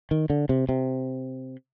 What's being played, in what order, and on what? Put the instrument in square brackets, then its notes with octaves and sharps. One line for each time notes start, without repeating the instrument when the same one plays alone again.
[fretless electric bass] D#3
D3
C3
C3